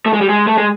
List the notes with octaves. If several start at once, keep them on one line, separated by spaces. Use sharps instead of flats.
A3
G#3
G3
G#3
A3
G#3